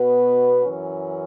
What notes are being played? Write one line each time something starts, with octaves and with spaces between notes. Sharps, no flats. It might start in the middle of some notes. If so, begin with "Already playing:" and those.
Already playing: B2 B3 B4
F#2 E3 C#4